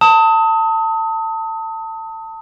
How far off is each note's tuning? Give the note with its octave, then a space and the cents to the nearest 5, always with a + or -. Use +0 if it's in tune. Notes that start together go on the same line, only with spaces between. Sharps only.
A5 +25 D#6 +30